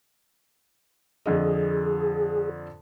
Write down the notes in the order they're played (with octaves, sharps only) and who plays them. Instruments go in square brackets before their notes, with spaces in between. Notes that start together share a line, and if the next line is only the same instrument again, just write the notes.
[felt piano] F2 D3 D#5 [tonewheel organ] G#4